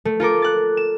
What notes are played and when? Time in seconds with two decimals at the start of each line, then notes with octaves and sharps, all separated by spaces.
0.05 A3
0.20 F4 A4 A#4 D6
0.42 F#6 A6
0.77 E7